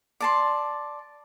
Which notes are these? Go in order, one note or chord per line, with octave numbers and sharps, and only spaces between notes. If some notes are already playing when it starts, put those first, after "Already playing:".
D5 A5 C6